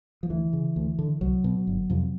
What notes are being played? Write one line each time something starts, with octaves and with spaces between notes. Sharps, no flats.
F3
D2 E3
C#3
D2
D3
C2 F#3
B2
G1
F2 C3